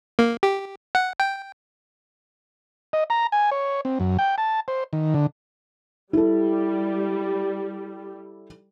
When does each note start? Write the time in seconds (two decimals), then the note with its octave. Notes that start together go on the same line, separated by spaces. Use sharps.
0.19 A#3
0.43 G4
0.95 F#5
1.20 G5
2.93 D#5
3.10 A#5
3.32 G#5
3.51 C#5
3.85 C4
4.00 F#2
4.19 G5
4.38 A5
4.68 C5
4.93 D#3
5.14 D3
6.13 G3 E4 A4